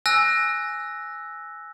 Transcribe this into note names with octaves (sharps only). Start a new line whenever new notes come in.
G#5 E6 F#6 A#6